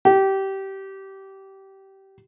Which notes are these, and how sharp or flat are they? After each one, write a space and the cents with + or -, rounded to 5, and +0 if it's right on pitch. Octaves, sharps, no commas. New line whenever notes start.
G4 -20